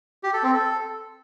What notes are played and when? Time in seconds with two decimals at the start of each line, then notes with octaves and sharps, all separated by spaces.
0.23 G4
0.33 A4
0.43 C4
0.53 A4